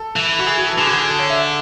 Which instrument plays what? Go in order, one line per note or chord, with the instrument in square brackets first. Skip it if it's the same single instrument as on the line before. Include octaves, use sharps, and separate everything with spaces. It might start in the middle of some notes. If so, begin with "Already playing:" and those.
Already playing: [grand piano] A4
[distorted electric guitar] E3
[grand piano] F#4
G#4
F#4
A4
[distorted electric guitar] D3 [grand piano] G#4
[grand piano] F#4
G#4
A4
C#5
E5